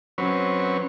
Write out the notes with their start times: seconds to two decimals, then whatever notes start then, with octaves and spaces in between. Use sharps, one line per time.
0.18 F#3 C4 C#4 B4 C#5